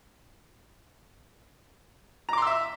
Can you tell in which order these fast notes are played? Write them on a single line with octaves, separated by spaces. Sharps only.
A#5 D6 C6 E6 E5